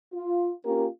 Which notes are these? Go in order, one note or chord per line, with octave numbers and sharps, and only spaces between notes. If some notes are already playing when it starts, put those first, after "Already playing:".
F4
A#3 C#4 F4 G4 A#4